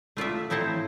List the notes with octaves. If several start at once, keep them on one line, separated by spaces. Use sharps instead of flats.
A3 F4 D5 E5
A2 C4 E4 A4 C5 A#5